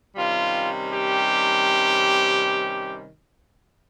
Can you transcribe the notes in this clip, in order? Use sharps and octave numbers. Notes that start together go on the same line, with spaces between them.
C3 D#3 G3 C#4 F4
G4